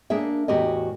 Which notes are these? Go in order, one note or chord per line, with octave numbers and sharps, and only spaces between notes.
A#3 D4 G#4 A#4 E5
E2 A2 F#4 G4 A#4 D#5